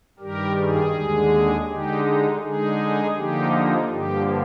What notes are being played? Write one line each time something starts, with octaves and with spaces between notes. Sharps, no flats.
G2 D#3 G3 G4 A#4
G#4
D#2 D3 G#3
D3 G#3 D#4 G4
D3 G#3 D#4 G#4
D3 F3 A#3 D#4 G4
G2 D3 F3 A#3 G4